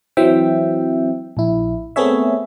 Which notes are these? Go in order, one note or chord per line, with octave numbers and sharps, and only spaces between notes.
E3 F#3 C4 E5 G5
A#1 E4
A3 B3 C4 G#4 C#5 E5